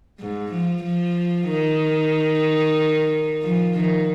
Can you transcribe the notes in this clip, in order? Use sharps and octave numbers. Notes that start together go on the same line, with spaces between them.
G#2
F3
F3
D#3
F3
D#3